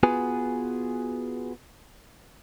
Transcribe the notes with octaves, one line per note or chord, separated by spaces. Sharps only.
B3 F4 F#4 G#4 B4 G#5